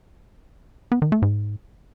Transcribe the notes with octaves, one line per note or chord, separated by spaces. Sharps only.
B3
D#3
A3
G#2